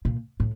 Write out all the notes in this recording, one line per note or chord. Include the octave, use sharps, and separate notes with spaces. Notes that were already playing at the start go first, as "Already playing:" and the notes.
A#2
A2